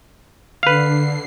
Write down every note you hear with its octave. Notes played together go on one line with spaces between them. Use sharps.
D3 B4 F5 C7